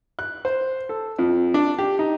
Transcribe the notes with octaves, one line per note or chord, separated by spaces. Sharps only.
F#6
C5
A4
F2
D4
G4
D#4